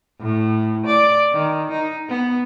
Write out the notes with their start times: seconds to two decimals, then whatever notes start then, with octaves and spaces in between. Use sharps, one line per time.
0.20 A2
0.86 D5
1.33 D#3
1.71 D#4
2.08 B3